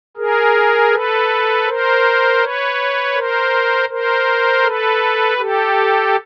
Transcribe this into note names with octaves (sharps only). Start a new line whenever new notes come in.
G#4 A#4
A4 B4
A#4 C5
B4 C#5
A#4 C5
A#4 C5
A4 B4
G4 A4